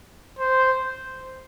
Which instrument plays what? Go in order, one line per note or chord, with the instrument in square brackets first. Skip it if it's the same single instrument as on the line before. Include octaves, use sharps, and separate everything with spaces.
[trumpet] C5